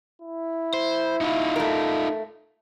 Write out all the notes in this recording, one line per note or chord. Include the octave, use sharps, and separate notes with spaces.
E4
C5
D#4 F4
A3 A#4